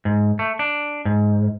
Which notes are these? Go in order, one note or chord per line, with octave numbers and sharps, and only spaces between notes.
G#2
A3
D4
G#2